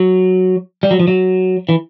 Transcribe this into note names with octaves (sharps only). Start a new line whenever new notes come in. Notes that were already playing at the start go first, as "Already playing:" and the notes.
Already playing: F#3
G3
F#3
F3
F#3
E3